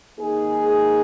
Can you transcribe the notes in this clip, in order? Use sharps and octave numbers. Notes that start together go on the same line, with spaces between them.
D#3 A#3 D#4 G#4